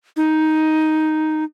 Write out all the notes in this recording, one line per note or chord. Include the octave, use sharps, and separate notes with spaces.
D#4